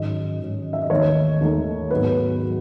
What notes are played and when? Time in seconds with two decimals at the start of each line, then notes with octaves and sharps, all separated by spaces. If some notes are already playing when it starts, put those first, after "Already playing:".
Already playing: G#2 D#3 F#3 C#4 D#5
0.41 G#2 D#3 F#3 C#4
0.73 E5
0.82 D#5
0.90 D#2 D#3 A3 D#4 C#5
1.41 D#2 D#3 A3 D#4
1.91 G#2 F#3 B3 B4
2.43 F#3